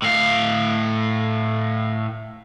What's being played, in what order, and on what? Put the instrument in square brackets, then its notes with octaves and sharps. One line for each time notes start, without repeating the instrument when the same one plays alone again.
[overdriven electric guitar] A2 F5